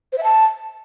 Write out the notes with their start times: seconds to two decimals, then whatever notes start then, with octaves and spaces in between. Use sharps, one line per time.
0.12 C5
0.18 E5
0.23 A5